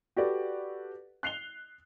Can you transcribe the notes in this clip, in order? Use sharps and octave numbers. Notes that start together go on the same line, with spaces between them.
F#4 G4 A4 B4 D5
F#6 C7 F7 G7